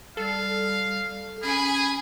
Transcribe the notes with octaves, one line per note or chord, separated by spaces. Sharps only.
G3 A4 F5
C#4 G#4 G#5 B5